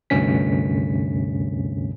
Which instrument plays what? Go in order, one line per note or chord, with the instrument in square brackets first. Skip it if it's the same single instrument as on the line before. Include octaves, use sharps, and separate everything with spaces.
[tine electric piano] D2 G2 C3 C#4 B6